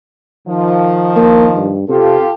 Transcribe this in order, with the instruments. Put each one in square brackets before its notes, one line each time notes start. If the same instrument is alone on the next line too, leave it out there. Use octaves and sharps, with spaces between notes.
[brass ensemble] D#3 F3
[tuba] A#3
G2
[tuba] C3 [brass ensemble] F4 G4 A4